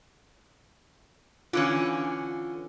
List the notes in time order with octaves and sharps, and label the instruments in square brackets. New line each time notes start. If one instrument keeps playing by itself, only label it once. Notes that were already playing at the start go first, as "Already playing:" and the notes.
[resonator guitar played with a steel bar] D3 E3 C#4 [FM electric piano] F4